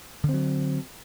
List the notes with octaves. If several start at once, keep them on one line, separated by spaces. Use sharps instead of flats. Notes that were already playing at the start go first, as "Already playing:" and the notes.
D3 F#3 C4